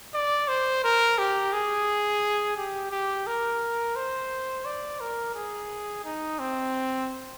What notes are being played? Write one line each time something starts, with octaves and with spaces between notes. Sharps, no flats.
D5
C5
A#4
G4
G#4
G4
G4
A#4
C5
D5
A#4
G#4
D#4
C4